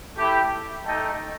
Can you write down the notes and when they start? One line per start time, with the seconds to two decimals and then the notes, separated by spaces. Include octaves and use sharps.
0.16 A3 E4 G4
0.86 A3 D#4 A4 D#5 G5